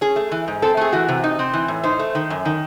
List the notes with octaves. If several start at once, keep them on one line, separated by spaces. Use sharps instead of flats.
C#4 G#4
A3
E3
G#2
C4 A4
A3 G#4
E3 F#4
C3
D#4
C4
E3
A2
D#4 C5
A3
D#3
F#2
D#3